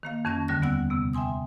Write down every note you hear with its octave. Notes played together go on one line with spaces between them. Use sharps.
D#3 A#3 F5
F2 D#3 C#4 A5 A#6
D#2 D3 G3 F#6
B3 F#5 E6 F#6
C3 B3
E5 G5 G#5 C6 D#6